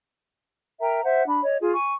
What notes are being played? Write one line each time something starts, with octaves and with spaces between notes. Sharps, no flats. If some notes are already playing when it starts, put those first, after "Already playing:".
A#4 E5 G5 A#5
C5 E5 F#5
D4 B5
C#5 D#5
F4 G#4
G#5 C#6